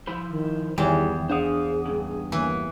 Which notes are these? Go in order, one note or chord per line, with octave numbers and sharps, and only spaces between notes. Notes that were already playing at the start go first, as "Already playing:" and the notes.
F3 E4 C5 B5
D#3
E2 G2 D#3 E3 G3 E4 G5
D4 G#4 C5 F5 F#5 D#6
G2 C#3
E3 A#3